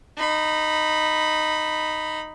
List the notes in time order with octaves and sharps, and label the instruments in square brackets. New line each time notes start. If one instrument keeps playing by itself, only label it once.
[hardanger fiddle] D#4 B5